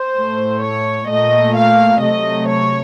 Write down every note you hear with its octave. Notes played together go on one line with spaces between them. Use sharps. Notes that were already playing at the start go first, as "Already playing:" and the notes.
Already playing: C5
A2 A3
C#5
A#2 A3 D#5
F5
C3 F#3 A3 D#5
C#5